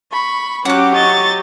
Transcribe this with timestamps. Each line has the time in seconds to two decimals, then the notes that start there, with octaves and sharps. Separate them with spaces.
0.12 B5 C#6
0.65 F#3 C#4 G4 F#5 D6 F#6
0.95 D#5 C#6 A6